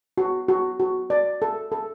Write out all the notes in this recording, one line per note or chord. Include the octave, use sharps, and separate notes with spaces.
F#4
F#4
F#4
D5
A4
A4